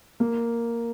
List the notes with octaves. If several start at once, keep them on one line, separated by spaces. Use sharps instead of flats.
A#3